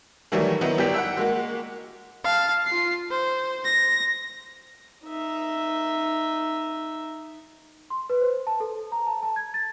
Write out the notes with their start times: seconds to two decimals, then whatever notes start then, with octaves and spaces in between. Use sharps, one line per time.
0.32 D#3 E3 F#3 G3 A3 E4
0.61 D#3 F#3 B3 D#4 E4
0.78 G1 G3 G5 B6
0.94 F#5 G5 E6
1.17 G#3 A#3 F#4
2.24 F5 A5
2.66 F4 C7
3.10 C5
3.64 A#6
5.05 D#4 E5
7.90 C6
8.10 B4
8.22 C5
8.47 A5
8.60 A4
8.92 A#5
9.07 A5
9.23 A5
9.36 G#6
9.54 A6